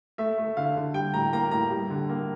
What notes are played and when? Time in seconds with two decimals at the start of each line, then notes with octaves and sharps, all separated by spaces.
0.18 A3 E5
0.38 A3
0.57 D3 F5
0.76 D3
0.94 G3 G5
1.14 A2 A#5
1.33 A#3 A#5
1.51 A2 A#5
1.70 G3
1.90 D3
2.09 A#3